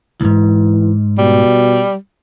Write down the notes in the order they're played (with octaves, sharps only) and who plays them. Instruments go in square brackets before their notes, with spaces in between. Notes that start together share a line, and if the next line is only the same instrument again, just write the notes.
[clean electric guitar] C#2 G#2 [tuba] E3
[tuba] B2 [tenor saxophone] G3